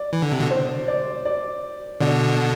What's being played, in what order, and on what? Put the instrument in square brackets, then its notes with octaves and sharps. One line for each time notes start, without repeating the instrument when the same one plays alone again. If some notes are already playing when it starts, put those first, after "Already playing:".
Already playing: [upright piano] D5
[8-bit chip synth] E3
D3
C3
B2 D3
[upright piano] C5
D5
D5
[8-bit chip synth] B2 D3 [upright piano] D5